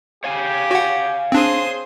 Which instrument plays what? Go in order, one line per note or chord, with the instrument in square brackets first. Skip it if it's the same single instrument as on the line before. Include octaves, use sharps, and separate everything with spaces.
[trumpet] G4 [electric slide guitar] C#5 F5 G#5
[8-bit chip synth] F#4 F#5
[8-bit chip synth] C4 D4 [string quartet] G#4 C5 D#6